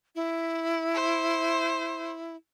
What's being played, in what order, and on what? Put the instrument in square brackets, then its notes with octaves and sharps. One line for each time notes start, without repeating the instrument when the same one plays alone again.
[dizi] E4
[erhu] C5